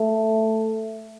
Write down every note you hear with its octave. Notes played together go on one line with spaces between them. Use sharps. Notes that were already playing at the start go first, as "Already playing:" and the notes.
Already playing: A3